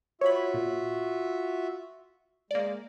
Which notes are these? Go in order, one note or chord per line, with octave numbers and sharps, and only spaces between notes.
F4 F#4 C#5 E5 B5
A#2
G#3 A#3 D5